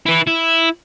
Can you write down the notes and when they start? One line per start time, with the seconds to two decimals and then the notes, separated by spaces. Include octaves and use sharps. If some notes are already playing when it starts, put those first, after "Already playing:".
0.06 E4 B4
0.27 E4